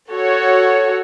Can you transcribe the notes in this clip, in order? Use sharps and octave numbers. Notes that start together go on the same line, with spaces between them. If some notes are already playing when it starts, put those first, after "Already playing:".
F#4 A4 C#5